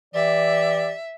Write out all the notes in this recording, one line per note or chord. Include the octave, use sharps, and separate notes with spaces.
E3 G4 D5 E5